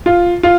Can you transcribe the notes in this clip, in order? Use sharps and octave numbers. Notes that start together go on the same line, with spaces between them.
F4
F4